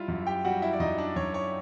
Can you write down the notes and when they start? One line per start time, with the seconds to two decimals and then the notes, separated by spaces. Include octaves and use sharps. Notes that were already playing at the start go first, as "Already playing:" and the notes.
Already playing: G3 E4 F4 E5 F5
0.08 F#2
0.27 G4 G5
0.45 G3 F#4 F#5
0.62 E4 E5
0.73 D5
0.80 F#2 D#4 D#5
0.98 D4 D5
1.16 F#2 C#5
1.34 C#5